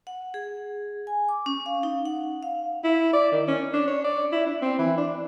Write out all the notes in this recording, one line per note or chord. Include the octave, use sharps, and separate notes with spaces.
F#5
G#4
G#5
D6
C#4
F5
D#4
F#5
F5
E4
D5
D#3
C#4
D4
C#5
D5
E4
D4
C4
E3
D4